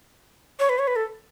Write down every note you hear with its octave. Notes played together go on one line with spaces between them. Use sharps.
C#5
B4
C#5
B4
A4